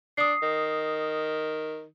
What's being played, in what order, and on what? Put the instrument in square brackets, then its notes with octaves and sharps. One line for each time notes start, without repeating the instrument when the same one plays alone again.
[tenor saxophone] D4 [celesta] D#6 C7
[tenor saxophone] D#3